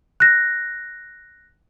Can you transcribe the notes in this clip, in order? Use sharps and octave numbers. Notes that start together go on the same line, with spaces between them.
F#6 A#6